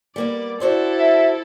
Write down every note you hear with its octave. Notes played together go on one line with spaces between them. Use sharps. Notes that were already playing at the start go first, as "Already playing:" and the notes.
G3 A#3 B3 D5
E4 F#4 A4 C5 D5
E5